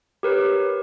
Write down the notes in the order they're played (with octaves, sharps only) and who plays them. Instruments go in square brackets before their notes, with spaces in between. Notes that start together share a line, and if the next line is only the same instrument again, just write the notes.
[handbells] G4 A#4 B4 C#5